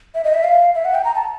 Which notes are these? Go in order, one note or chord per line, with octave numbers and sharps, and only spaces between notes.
E5
D#5
E5
F5
E5
F#5
G5
A#5
A5